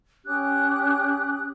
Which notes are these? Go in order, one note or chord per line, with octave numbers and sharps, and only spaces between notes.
C#4 G4 D#6 F#6